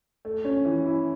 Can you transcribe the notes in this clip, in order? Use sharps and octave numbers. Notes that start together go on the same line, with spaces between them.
A3
C#4
E3
E4